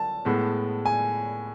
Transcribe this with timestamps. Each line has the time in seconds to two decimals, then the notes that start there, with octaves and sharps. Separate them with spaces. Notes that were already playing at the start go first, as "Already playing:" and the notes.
Already playing: A5
0.25 A2 G#3 B3
0.86 G#5